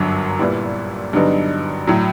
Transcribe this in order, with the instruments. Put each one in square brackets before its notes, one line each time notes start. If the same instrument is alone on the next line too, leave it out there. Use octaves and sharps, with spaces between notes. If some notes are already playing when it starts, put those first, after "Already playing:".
Already playing: [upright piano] G1 F#2 D3 F#3
A#2 G3 B3 E4 G4
G2 D3 F#3 B3 D#4
A2 F#3